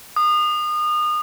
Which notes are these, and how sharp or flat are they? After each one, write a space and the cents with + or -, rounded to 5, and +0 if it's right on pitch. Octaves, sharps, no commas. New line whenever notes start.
D#6 -30